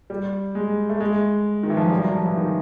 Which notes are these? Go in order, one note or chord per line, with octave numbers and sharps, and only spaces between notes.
G3
G#3
A3
G#3
D#3
E3
F3
F#3
G3
F#3
F3
E3
D#3